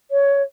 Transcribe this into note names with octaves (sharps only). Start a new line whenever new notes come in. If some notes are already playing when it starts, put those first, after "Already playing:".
C#5